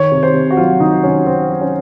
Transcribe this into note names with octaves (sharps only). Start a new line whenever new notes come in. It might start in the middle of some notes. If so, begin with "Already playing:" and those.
Already playing: D#3 C#5
C3
C5
C3
F#4
F#3 F4
D#3 D#4
C3 C#4
C3 C4
F#3
C#4